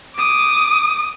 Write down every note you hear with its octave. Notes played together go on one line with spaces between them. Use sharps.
D6 D#6